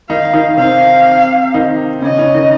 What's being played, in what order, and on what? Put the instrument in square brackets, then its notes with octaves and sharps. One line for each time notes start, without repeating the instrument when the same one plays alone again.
[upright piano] D#3 D#4 [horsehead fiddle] F5
[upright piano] D#3 D#4
[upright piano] C3 C4 [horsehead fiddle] F5
[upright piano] D#3 D#4
[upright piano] C#3 C#4 [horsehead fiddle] D#5
[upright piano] C#3 C#4
D#3 D#4